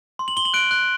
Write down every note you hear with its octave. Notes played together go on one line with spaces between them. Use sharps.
C6
F#7
C6 G7
F#7
F#6 D7
F#6